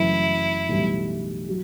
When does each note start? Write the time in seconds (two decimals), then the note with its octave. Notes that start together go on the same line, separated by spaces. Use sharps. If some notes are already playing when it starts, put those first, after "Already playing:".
Already playing: F#1 F#2 E3 A3 E4
0.69 B1 A2 E3 G3
1.49 F#3